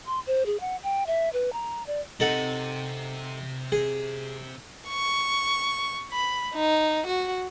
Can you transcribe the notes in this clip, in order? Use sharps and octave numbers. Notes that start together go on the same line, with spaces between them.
C6
C5
G#4
F#5
G5
E5
B4
A#5
D5
C3 D#4 A4 F#5
G#4
C#6
B5
D#4
F#4